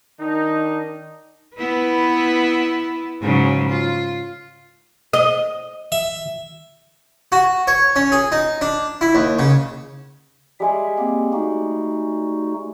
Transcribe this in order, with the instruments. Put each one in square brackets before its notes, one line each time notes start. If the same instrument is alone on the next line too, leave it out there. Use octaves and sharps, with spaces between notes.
[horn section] D#3 D4 D#4
[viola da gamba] B3 E4 B4
G#2 C#3 F#3
F4
[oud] D#5
[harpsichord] E5
F#4
C#5
C#4
G#4
D#4
D4
E4
D#2
C#3
[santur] G3 G#3 G#4 [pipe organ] E5
[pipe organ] A#3 C4 G4
A3 D#4 F#4